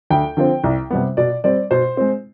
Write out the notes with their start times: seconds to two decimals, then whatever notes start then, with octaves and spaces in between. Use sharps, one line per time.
0.10 D2 G5
0.37 D3 F3 C4
0.64 C2
0.91 C3 G3 B3
1.17 B2 D5
1.44 G3 C4 D5
1.71 B2 C5
1.97 G#3 C4